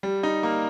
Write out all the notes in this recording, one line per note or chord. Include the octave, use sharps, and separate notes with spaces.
G3
D#4
A#3